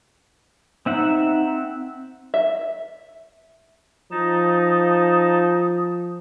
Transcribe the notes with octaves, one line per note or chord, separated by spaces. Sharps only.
C4 D#4 E5 F#5
E5
F3 D#4 A5 D#6